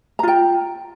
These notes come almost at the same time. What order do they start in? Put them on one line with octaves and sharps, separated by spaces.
A#5 F4 G5